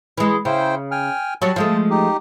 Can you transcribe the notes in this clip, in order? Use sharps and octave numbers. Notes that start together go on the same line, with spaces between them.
E3 G#3
C#3 E4 C5 G5
G5 G#5 F6
F#3 G3 F#4 A5
F3 G#3 A3
D#4 G4